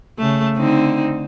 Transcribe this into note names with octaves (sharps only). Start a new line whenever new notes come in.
C#3 A3
D3 C4 D#4